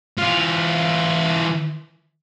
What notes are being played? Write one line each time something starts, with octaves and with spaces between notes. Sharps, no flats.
E3 F4